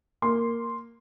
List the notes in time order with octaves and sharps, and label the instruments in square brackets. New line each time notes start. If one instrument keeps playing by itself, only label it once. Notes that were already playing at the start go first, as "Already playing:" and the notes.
[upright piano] A#3 C6